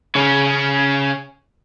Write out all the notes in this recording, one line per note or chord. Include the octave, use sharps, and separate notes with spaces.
C#3 C#4